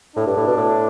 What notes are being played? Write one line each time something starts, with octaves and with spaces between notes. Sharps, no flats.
A2 D4
G2
A2
B2
A2